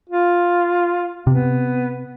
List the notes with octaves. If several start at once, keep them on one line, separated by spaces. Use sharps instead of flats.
F4
C3 B3